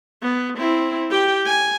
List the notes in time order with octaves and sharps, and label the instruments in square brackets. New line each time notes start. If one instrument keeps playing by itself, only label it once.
[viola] B3
C4 E4
G4 G5
G#5